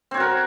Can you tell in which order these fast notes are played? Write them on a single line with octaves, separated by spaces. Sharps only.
C4 C#5 F#4 A#4